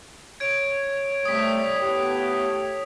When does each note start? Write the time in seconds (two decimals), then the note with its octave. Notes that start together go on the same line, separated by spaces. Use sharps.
0.40 C#5 G#6 D7
1.25 C3 G3 A3 D#6 B6
1.78 A2 A3 B3 G4